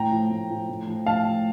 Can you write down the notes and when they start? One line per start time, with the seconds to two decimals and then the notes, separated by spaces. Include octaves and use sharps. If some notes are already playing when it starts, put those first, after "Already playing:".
Already playing: A2 G5 A#5
0.12 F3
0.31 A2
0.50 F3
0.69 A2
0.87 F3
1.06 A2 F5 A5
1.26 F3